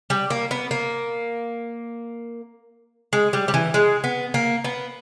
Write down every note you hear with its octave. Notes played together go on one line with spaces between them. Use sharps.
G3
A#3
B3
A#3
G#3
G3
G3
E3
G#3
B3
A#3
B3